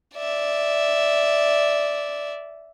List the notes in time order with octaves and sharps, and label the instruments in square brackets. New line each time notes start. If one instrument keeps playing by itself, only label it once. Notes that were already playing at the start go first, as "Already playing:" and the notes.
[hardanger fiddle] D5 E5